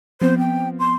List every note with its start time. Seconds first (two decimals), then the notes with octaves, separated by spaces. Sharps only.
0.22 F3 B3 C4 C5
0.39 G5
0.79 C6